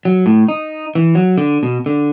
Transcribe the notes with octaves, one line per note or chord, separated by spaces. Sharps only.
F#3
A2
D#4
E3
F#3
D3
B2
D3